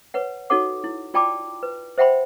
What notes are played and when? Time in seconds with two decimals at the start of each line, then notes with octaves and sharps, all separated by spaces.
0.14 B4 C#5 F#5
0.50 D#4 F#4 A4 C#5 F#5 D6
0.84 E4
1.14 F4 D5 G5 A5 B5 D6
1.63 B4
1.98 C5 E5 F#5 G5 B5 C6